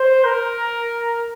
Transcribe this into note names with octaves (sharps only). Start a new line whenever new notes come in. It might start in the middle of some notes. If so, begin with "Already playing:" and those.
Already playing: C5
A#4